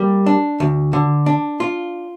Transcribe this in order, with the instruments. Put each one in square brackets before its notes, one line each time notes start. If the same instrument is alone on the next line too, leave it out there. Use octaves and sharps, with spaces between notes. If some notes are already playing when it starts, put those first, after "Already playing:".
Already playing: [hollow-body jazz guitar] G3 A#3
D4
D2
D3
D4
F4